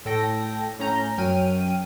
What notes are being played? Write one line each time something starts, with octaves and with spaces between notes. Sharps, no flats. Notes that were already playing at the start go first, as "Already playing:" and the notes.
A2 A4 G5 A#6
A2 C#4 A#5 G6
F#2 F#3 G5 F6 D#7